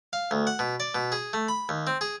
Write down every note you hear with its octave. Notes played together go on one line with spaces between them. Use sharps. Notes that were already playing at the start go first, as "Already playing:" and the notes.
F5
D2
F#5
B2
D5
B2
G#4
A3
B5
D#2
C4
G#4